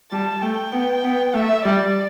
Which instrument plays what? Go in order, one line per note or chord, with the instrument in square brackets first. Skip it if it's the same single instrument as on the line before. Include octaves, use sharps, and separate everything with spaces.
[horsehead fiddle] G3 [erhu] A5
[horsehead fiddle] A3 [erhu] G5
[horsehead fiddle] B3
B3
[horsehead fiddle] A3 [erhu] E5
[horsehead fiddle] G3 [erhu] D5